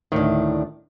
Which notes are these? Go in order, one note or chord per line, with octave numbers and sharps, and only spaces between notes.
D2 A2 D#3 D4